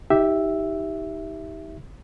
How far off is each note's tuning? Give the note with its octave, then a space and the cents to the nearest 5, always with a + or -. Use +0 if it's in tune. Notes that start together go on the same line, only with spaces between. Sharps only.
D#4 +30 G4 -5 E5 +0